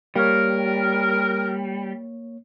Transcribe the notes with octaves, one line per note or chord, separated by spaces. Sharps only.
G3 A#3 A#4 C#5